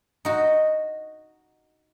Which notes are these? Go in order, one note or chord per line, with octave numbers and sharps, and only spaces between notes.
D#4 F#4